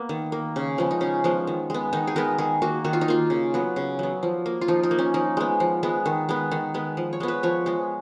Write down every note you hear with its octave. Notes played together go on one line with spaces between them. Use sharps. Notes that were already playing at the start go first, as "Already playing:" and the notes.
Already playing: A#3 B3
D#3
A#3
C#3
F3 G#3 B3
D#4
C#3 C#4
F3 G#3 B3
D#3
G#3 B3
D#3 D#4
G#4
G#3 B3 A#4
D#3 G#4
A#3 F#4
D#3 F#4
F4
D#4
A#3 F4
C#3
F#3 B3
C#3
F#3 B3
F3
A#3
F4
F3 D#4
D#4
A#3
C#4
F3 D#4
G#3 B3
F3
G#3 B3
D#3
G#3 B3
D#3
G#3 B3
F3
C#5
G#3 B3
B4
F3 C#5
G#3 B3